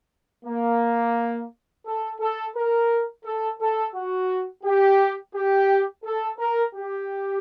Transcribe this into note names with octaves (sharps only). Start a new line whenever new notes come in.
A#3
A4
A4
A#4
A4
A4
F#4
G4
G4
A4
A#4
G4